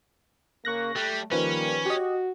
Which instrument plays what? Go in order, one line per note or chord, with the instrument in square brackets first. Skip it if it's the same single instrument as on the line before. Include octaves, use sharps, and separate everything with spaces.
[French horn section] C#3 A#3 [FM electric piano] C#6 F#6 A#6
[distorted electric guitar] G3 [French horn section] A3
[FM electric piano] D#3 F3 B4 [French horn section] G3 A#3 [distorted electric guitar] C#4
[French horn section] F#4 [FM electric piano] G4 D#5